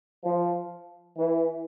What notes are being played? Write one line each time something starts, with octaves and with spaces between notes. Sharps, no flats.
F3
E3